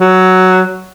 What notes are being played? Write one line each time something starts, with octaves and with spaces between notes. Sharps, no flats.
F#3